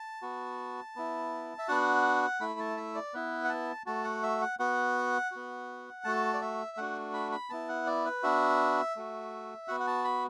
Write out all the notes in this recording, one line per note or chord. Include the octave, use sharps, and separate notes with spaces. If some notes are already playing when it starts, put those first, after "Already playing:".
Already playing: A5
B3 F#4
B3 E4
E5
B3 D4 F#4 F#5
A3 E4 B5
A5
E5
D5
B3 E4 B4
F#5
A5
A3 F#4 A5
F#5
E5
F#5
B3 F#4 F#5
B3 F#4
A3 F#4 A5
D5
E5
A3 D4 F#4 F#5
B5
B5
B3 E4 A5
F#5
D5
B4
B3 D4 F#4 E5
A3 F#4
B3 F#4 F#5
F#5
A5
B5